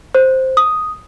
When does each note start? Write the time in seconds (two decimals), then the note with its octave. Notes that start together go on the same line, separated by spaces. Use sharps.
0.15 C5
0.57 D#6